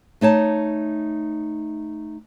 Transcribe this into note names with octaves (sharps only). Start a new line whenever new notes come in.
A3 D#4 C#5 A5